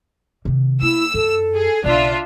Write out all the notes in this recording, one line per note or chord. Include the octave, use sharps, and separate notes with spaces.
C3 D#3
A#3 E4 E6
F#2 A4
G#4
B1 C#3 D4 F4 D5 E5